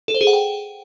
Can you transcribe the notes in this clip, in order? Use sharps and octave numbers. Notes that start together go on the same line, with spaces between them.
A4
C5
G#4
F#5
G5